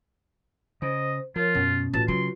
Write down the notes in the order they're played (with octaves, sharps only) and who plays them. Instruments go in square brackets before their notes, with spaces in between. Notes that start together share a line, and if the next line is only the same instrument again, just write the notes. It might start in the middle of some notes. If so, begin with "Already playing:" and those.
[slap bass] C#3 [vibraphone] C5 [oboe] D#5
[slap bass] F3 [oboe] F4 [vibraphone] A#4 C#5
[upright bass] F#2 [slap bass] B2 [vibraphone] C#4
[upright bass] A1 [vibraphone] F4 F#4 B4 [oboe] A5
[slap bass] C#3 [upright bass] F#3 [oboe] C6